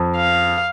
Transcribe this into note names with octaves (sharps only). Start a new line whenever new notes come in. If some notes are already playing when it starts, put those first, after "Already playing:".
Already playing: F2
F5